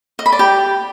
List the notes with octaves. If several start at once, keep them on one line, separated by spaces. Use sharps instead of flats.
D#5
B5
D5
G4